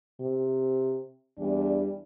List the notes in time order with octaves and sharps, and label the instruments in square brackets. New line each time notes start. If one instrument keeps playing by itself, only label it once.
[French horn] C3
[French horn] E2 [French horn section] E3 G3 D4